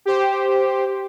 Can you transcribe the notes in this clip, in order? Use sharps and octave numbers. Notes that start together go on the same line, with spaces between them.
G4 C5